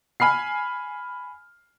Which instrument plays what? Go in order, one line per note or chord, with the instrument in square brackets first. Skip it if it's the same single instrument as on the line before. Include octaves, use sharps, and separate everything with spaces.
[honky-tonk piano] G#5 B5 F6 C7